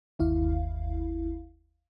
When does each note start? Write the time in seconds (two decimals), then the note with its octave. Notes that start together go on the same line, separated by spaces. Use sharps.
0.19 G1 D#2 E4 F5